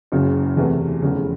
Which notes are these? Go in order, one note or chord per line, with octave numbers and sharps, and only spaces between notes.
F#1 F#2 C#3
E2 C3 E3 A3
F1 E2 C#3